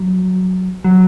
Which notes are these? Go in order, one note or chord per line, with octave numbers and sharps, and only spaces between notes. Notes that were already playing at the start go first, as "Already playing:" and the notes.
Already playing: F#3
F#3